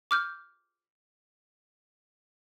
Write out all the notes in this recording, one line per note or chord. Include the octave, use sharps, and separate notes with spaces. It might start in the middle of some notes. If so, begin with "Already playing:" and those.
D6 F6 G6